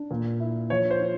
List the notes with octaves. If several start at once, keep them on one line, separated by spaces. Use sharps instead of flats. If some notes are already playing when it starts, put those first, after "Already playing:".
Already playing: D4
A#2
E4
F3 C#5
C5
F4